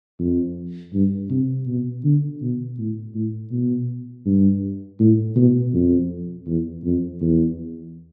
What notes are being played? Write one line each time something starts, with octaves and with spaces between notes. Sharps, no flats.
F2
G2
C3
B2
D3
B2
A2
A2
B2
G2
A2
B2
F2
E2
F2
E2